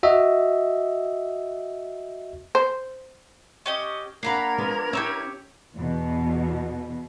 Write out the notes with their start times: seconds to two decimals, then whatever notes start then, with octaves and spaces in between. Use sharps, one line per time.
0.03 F#4 D#5 E5
2.55 C5
3.66 C#4 G4 D#5
4.23 A#3 D4 A#4 F5 F#5 A#5 B5 G#6
4.58 F3 G#3 B3
4.93 C#4 E4 G4 C#5 E6
5.76 E2 B2